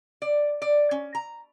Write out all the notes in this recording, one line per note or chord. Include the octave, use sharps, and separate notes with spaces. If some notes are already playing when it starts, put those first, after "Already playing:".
D5
D5
C#4
A#5